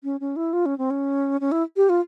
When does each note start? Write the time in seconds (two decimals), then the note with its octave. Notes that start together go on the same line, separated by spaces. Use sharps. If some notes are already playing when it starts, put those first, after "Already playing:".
0.04 C#4
0.20 C#4
0.36 E4
0.53 F4
0.66 C#4
0.78 C4
0.91 C#4
1.41 C#4
1.52 E4
1.77 G4
1.89 F4